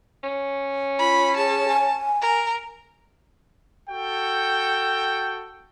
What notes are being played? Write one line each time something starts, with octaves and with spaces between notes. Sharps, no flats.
C#4
F4 B5
G#4 A5
G#5
A#4
F#4 A4 G5